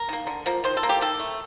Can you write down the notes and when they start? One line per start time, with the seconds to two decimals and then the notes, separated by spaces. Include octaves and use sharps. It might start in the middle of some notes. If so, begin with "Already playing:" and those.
Already playing: A#4
0.09 D#3 A#3
0.27 D3
0.46 F3 A#3
0.64 D#3 C5
0.77 A4
0.83 A#3
0.89 G4
1.01 D#3 A4
1.20 A3